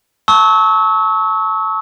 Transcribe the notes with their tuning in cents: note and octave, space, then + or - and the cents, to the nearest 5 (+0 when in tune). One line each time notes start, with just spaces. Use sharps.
A5 +0 C#6 +0 E6 -35